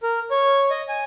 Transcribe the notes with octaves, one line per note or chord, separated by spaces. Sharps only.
A#4
C#5
D#5
G#5